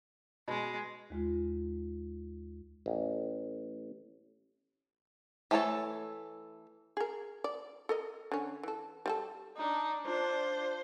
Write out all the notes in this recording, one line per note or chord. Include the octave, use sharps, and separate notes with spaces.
B2 G#3
D#2 G#3 F4
A1
E3 A3 A4 C#5 A5
G#4 A#4
D5
A4 A#4 D#5
D3 C#4
E3 A4
G3 F4 A4
D4 D#4
D4 F4 C5